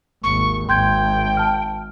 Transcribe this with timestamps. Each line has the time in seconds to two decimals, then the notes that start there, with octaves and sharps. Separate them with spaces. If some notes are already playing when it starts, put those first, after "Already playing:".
0.23 G#1 D#2 C#6
0.69 G#1 G5 C6 G6 G#6
1.37 A5 F6